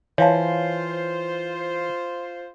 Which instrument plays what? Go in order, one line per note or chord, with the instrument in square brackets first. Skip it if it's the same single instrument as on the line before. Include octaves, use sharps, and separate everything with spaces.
[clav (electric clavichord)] E3 [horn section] F4 C5 [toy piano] C#5 F5 A5